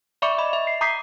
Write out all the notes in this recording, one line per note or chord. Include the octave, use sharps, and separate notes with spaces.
D5 E5 B5 C#6 D6 C#7
D#5 B5
E5
C7
A#5 D6 D#6 G6 B6 C7